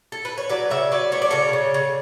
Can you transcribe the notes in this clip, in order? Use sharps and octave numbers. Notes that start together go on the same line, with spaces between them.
A4
B4
C#5
F#3 B4 D5
C#3 C#5 E5
F#3 B4 D5
A3 C#5
D5
C#3 A4 C#5
C#3
C#3